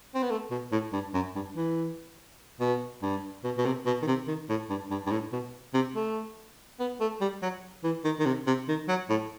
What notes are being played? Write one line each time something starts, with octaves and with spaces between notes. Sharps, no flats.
C4
B3
A3
B2
A2
G2
F#2
G2
E3
B2
G2
B2
B2
C3
B2
D#3
C3
D#3
A2
G2
G2
G2
A2
B2
C3
A3
B3
A3
G3
F#3
E3
D#3
D#3
C3
C3
D#3
F#3
A2